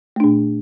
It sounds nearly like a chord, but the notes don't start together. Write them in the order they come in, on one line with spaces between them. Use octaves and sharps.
A3 D4 A#2